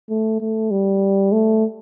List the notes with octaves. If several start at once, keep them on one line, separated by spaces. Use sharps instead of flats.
A3
A3
G3
A3